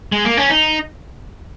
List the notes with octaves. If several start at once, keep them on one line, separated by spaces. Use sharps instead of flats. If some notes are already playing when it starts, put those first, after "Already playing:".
G#3
A#3
C#4
D#4